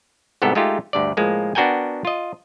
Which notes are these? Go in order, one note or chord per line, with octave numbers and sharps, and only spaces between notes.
C2 G#2 B3 G4 A4
G#3 A3 D#4 F4 G4
D2 G2 D5
A2 F3 G#3 A#3
B3 D4 F#4 A#4 G5 G#5
F4 D#5